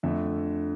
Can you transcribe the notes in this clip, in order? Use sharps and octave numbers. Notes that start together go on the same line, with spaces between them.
F2 D3 A3 E5